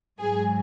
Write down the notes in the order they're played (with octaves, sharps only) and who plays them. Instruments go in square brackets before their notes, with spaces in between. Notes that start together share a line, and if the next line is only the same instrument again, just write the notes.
[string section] G#2 F#3 G#4